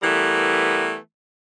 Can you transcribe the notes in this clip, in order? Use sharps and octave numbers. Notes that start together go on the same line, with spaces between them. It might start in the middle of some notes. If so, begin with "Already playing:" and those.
E3 G3 A3 B3 A#4